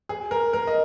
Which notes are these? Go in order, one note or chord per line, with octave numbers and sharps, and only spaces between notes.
G#4
A#4
A#4
D#5